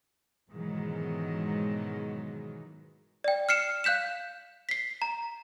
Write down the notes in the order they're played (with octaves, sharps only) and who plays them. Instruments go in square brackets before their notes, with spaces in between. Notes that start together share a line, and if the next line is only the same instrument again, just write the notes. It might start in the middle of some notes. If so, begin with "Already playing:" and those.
[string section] G#2 B2 D#3 E3 F#3 G#3
[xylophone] D5 G5
F6 C7 C#7 E7
F5 F#6 G6 B6 E7
B6 C7
A#5